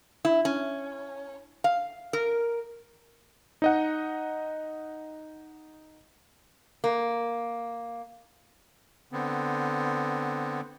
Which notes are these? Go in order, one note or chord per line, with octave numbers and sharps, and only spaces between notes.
E4
C#4
F5
A#4
D#4 D#5 F#5
A#3
D3 B3 C4